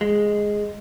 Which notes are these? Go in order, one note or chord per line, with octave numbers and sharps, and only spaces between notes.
G#3